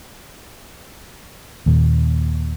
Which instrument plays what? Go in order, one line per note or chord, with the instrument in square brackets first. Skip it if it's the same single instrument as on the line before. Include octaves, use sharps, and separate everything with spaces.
[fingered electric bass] D#2 A#2